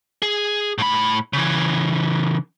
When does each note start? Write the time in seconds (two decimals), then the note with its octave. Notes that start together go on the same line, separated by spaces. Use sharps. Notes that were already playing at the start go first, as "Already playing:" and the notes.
0.22 G#4
0.78 A2 B5
1.33 C#3 E3